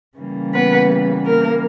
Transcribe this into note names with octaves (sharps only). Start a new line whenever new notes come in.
C#3 E3 G3 A#3
B3 B4
A#3 A#4